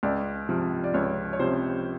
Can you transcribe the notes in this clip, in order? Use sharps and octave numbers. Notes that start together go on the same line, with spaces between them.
C#2 D5
C3 F3
D5
C#2 C#5
C#5
C3 F3 C5